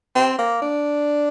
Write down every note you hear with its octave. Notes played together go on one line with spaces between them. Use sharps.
C4
A#3
D4